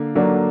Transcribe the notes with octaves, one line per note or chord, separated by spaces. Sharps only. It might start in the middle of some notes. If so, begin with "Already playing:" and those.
Already playing: D3 A#3
D3 F#3 A#3 D4